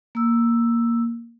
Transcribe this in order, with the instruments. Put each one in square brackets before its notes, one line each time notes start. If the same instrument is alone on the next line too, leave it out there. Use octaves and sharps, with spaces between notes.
[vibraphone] A#3 E6